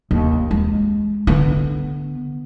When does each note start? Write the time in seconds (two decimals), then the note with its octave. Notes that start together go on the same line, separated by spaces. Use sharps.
0.11 D#2
0.51 G#3
1.27 D3 B3